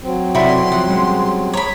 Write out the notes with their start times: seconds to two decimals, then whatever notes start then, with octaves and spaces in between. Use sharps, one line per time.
0.02 F#3 C4
0.35 C3 E4 F#4 A4 D5 B5 C6
0.72 F3 F#5
0.88 G3 G#3 C#4
1.53 C#5 A#5 B5